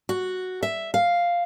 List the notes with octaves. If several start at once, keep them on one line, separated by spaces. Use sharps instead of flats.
F#4
E5
F5